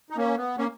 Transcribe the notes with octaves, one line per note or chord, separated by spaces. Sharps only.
D#4
A#3 C#4
B3
A#3 C#4